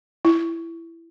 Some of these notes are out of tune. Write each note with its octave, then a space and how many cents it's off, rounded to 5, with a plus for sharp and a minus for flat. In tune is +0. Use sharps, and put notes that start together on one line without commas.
E4 +15